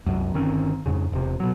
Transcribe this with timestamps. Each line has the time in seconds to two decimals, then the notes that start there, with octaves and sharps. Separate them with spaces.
0.06 C2 F#2
0.34 G1 D#3 C4 C#4
0.86 F2 G#2 C#3
1.12 E1 C3
1.40 B2 F#3